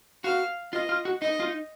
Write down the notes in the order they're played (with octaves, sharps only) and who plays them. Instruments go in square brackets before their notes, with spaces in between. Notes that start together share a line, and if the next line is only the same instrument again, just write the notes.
[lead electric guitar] F#4 [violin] F5
[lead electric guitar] F4 [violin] D#5
[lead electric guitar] F4
F#4
[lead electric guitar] D#4 [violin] D#5
[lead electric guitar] F4
D#4